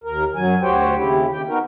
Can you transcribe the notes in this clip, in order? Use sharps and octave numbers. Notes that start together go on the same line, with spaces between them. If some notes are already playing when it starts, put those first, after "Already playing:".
D#2 A#4
F#2 F#3 G#5
D2 F#4 G4 C5 C#5 G5
D#2 C#3 E4 G4
C#3 G4 G5
B3 D#4 F#4 A#4